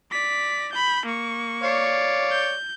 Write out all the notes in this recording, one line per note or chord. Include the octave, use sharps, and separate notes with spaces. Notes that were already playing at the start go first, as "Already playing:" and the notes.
D5 B6
B5 G6
A#3 C#6
C#5 D5 F5
G6